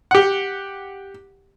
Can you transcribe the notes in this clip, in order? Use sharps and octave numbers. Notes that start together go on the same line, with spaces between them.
G4 F#5